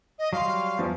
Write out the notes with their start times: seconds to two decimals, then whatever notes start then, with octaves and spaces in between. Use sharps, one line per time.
0.19 D#5
0.33 F#3 G3 F5 C6
0.78 E2 F3